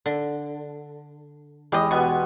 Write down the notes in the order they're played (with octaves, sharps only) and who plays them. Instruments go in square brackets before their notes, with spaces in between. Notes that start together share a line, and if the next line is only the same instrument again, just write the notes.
[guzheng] D3
[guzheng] E2 D#5 [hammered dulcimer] G#3 G4
[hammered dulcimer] B2 B3 C#6 [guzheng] G#5